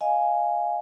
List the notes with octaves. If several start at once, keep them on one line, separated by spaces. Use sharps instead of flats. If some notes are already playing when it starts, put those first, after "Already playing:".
D#5 F5 G#5